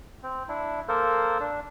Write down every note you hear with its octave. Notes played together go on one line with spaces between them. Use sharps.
C4
D4 E4
A#3 A4 A#4 C5
D4